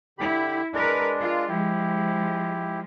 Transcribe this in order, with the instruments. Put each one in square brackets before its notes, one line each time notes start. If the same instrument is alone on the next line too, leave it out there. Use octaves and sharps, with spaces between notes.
[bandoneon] D3 G4 B5 [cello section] E4
[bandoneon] G#3 D4 [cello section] A#4 B4
[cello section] F4 A#4
[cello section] F3 G#3 [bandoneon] E4 G4